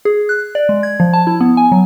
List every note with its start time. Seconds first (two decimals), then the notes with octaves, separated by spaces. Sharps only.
0.05 G#4
0.29 F#6
0.55 D5
0.69 G#3
0.83 G#6
1.00 F3
1.13 A5
1.27 E4
1.41 B3
1.57 G#5
1.72 F#3